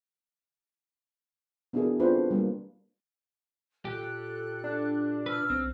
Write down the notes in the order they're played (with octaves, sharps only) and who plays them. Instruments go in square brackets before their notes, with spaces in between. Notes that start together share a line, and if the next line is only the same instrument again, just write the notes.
[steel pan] B3 D4 E4 F#4 G#4 A#4
C4 D4 F4 A4 B4 C5
G3 A#3
[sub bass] A#2 [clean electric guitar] G4 [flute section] A4 F#6
[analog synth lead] D4
[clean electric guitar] B4 [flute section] E6 F6
[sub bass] B1 [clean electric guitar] C4